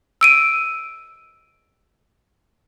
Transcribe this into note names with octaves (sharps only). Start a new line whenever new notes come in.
E6 D7 D#7